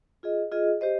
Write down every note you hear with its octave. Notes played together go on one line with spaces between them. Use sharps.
F4 G#4 D#5
F4 G#4 D#5
G4 C5 D#5